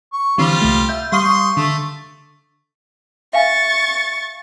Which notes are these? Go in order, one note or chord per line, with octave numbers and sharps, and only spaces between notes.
C#6
D3 E3 G3 C4 F4
C2 A3
E5 G6
G3 F5 C6 C#6 D#6
D3 A3
E5 F5 G#5 C#6 A6